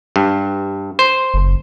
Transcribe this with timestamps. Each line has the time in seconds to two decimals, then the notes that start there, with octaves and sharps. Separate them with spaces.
0.16 G2
0.99 C5
1.34 F#1